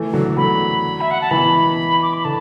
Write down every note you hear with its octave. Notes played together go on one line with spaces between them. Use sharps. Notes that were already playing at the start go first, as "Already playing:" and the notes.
Already playing: E3 A3
D3 F#3
D3 F#3 B5
E5
F#5
A5
B2 E3 B5
D6
B5
D3 A5